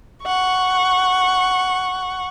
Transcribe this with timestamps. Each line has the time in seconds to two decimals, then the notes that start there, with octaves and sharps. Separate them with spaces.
0.24 F#5 C#6